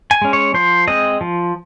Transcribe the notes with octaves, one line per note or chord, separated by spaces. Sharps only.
G#5
G#3 C#4
C#5
F3 C5
G#3 C4 D#5
F3